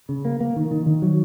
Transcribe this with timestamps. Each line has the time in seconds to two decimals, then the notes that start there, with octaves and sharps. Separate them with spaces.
0.09 C#3
0.25 A#3
0.40 A#3
0.56 D#3
0.71 D#3
0.86 D#3
1.02 F#3